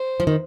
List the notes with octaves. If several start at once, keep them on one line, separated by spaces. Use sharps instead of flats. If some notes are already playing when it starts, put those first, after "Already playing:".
Already playing: C5
F3
D#3